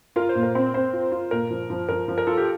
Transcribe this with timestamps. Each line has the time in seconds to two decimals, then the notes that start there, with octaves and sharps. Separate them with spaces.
0.16 F4 A#4
0.29 C5
0.35 A#2
0.43 A#4
0.55 C4
0.74 C4 C5
0.93 F4
1.12 F4
1.31 A#2 A#4
1.51 F3
1.70 F3
1.89 F3 A#4
2.08 F3
2.18 A#4
2.27 F4 A4
2.37 G4